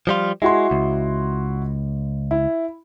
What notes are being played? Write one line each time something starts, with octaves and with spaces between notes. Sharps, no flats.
F3 G3 F4
G#3 E4 F#4 C6
C#2
E4